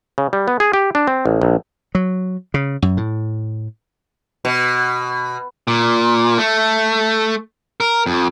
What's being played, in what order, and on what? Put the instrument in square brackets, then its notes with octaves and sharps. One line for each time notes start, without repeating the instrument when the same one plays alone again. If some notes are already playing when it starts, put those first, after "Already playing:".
[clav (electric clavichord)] C#3
G3
B3
G#4
G4
D4
C4
A1
A#1
[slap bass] F#3
C#3
F#2
A2
[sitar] B2
[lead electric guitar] A#2
A3
A#4
F2